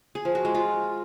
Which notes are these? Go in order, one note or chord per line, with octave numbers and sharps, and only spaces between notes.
G#4
F3
F#4
G#3
F4